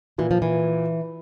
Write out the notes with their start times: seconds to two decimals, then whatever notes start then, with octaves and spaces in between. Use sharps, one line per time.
0.18 A#2 E3
0.31 F3
0.42 E3